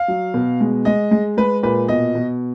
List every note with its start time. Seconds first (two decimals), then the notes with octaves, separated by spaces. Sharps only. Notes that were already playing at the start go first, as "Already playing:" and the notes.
Already playing: F5
0.08 F#3
0.34 B2
0.60 G#3
0.85 G#3 D#5
1.11 G#3
1.37 G#3 B4
1.63 A#2 B4
1.88 B2 D#5
2.15 B2